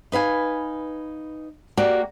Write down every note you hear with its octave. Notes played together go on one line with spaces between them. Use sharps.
D#4 B4 F5 G#5
A#3 F#4 G4 D5